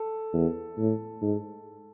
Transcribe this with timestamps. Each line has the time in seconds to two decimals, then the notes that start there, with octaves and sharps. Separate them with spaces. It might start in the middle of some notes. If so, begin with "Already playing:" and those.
Already playing: A4
0.34 E2
0.78 A2
1.22 G#2